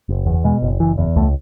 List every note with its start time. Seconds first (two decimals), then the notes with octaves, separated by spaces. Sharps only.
0.09 F#1
0.26 E2
0.44 B2 G#3
0.62 F#1
0.80 F#1 E3
0.98 E2
1.16 C#2 A3